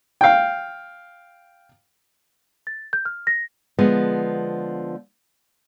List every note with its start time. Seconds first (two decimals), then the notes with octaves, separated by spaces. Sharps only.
0.21 F5 G5
2.67 A6
2.93 G6
3.05 F6
3.27 A#6
3.79 D3 F3 G#3 B3